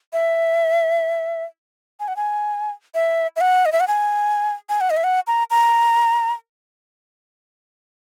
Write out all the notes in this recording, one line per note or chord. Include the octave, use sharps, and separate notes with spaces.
E5
G#5
F#5
G#5
E5
E5
F#5
D#5
E5
F#5
G#5
G#5
F#5
D#5
E5
F#5
A#5
A#5